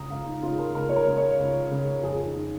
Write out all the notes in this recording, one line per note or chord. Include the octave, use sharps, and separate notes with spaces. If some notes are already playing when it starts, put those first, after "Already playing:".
Already playing: C#2 C#3 A#5 D#6
C#2 F5
D#4
C#3 F4
A#4
C#2 A#4
C#5
A#4
C#3
C#5
C#2
C#3
F2 G#4
D#4
D#3